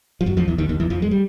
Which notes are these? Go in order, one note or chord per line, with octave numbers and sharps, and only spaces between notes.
F3
F#2 F#3
F2 F3
E2 E3
D#2 D#3
D#2 D#3
E2 E3
F2 F3
G#3
G3